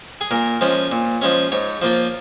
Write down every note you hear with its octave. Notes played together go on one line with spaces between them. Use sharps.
G#4
A#2 A#4
F3 G#3 C#4
A#2
F3 G#3 C#4
G#2 C#5
F3 A#3 F4